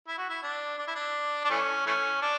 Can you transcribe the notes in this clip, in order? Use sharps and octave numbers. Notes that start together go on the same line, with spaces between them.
E4
F#4
E4
D4
D4
E4
D4
D4
E3 A3 C#4
E3 A3 C#4
D4